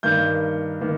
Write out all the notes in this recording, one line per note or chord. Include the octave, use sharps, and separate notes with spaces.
G2 D#3 A#3 G6
D#3 A#3